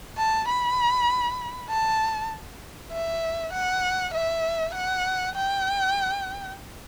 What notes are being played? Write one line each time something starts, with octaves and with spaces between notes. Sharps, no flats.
A5
B5
A5
E5
F#5
E5
F#5
G5